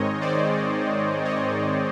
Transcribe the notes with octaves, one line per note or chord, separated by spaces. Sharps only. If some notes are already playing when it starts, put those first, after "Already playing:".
Already playing: G#2 D#3 G#3 C4 C#5 D#5
C5 D5
C#5 D#5